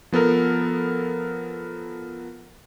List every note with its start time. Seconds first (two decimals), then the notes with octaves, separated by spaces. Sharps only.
0.12 F3 B3 A4 A#4